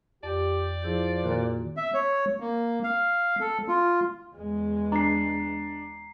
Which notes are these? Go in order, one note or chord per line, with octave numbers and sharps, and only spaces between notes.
F2 G4 D5
F3 E4 G#4 G6
A#2 D#3 F#4
E5
C#5
A#3
F5
A4
F4
E2 G#3
D4 A#5 C7